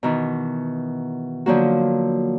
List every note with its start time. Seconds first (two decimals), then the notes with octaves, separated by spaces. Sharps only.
0.03 B2 D#3 E3
1.46 D3 F3 F#3 A#3 F#4